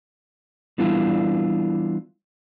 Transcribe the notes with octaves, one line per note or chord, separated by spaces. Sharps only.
E3 G3 B3 D4 E4 F4